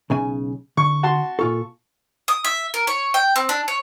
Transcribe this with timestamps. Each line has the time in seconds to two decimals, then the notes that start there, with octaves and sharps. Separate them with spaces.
0.10 B1 C#3 G#5
0.77 D3 C#6
1.03 F#4 A5 C6
1.39 A#2 F4 A4 C#6
2.28 D#6
2.45 E5
2.74 A#4
2.87 C#5
3.14 G5
3.36 C4
3.49 D4
3.68 C#5